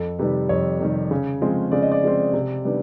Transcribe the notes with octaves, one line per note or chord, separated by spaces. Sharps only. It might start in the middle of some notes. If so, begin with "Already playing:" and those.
Already playing: F2 A4
C3 D#3 G3 B4
F2 C#5
C3 D#3 G3
C#3
F3 G#3 C4
C#3 D5
D#5
D5
F3 G#3 C4
C3
D#3 G3 B3 D4